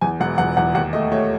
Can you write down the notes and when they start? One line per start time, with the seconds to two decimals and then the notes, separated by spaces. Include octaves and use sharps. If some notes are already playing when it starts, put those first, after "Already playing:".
0.01 E2 G#5
0.20 E1 F#5
0.38 E2 F#5
0.57 E2 F#5
0.75 D#2 F#5
0.93 A3 D#5
1.12 A3 C#5